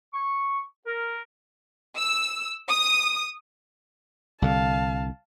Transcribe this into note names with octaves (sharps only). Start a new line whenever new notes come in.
C#6
A#4
E6
D#6
C2 D3 F5 A5